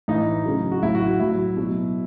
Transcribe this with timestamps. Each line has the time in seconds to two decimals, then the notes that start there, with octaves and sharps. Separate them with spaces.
0.08 A2 E3 D#4
0.45 C#3 F#3
0.72 F#4
0.82 A2 F#3 E4
0.95 F#4
1.07 F#4
1.20 A2 F#3 E4
1.57 B2 F#3